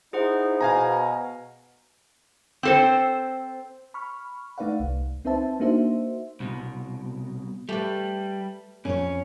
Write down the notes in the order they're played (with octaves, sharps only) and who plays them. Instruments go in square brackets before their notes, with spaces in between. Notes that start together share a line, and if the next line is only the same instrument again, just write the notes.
[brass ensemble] D#4 E4 [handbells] G#4 C5 F#5
[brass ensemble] B2 [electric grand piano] F5 G#5 A#5
[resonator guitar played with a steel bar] C4 A4 C5
[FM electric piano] B5 C#6 F6
A3 D#4 B4 D5 F5 F#5
C2
C4 D#4 B4 C5 E5 A5
A#3 D4 D#4 F#4 C5 E5
[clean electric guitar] C2 B2
[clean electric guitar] G3 [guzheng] A3 G4 B4
[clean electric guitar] F2 [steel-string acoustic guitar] C#4 C#5